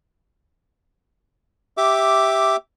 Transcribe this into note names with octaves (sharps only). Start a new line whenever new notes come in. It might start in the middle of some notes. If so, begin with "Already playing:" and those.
G4 E5 D6